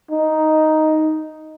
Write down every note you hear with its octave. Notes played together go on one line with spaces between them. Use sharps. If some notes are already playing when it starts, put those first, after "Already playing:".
D#4